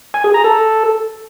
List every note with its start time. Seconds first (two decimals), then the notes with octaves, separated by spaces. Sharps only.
0.14 G#5
0.24 G#4
0.34 A#5
0.44 A4